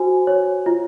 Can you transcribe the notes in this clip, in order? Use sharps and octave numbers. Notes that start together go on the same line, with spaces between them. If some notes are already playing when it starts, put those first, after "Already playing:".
Already playing: F#4 C5 G#5
C#5
F4